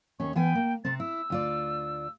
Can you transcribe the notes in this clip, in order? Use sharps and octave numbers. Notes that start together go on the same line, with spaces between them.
D#2 C#4 C#6
E3 B3 G5 G#5
A#3
C3 C4 A6
E4 E6
D2 F4 D5